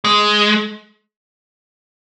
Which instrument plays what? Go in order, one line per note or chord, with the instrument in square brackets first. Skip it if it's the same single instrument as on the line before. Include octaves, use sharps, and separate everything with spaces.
[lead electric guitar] G#3